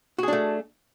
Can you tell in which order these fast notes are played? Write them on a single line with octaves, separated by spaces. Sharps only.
F#4 G#4 D4 A3